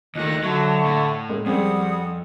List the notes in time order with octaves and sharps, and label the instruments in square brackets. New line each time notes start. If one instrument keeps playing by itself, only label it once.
[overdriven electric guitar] D#2 A3 [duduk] D#3 [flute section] F4 D#5 F#6
[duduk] D3 [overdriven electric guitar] F#3 [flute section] E5 A5 C#6
[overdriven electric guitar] A2
[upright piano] G#3 A#3 G#4
[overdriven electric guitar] F2 [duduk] G3 [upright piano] C4 G#4 [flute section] F#5 D#6